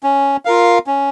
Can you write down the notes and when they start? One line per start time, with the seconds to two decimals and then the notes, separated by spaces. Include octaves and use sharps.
0.03 C#4
0.45 F4 A#4 F5
0.87 C#4